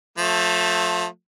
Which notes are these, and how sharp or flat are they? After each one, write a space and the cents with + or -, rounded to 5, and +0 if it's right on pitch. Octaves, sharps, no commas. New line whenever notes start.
F3 +30 A3 +0